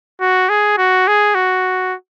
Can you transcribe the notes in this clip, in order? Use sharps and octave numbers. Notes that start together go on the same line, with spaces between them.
F#4
G#4
F#4
G#4
F#4